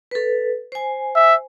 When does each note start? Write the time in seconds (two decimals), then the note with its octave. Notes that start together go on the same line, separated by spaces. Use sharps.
0.11 A4 B4
0.72 C5 G#5
1.15 E5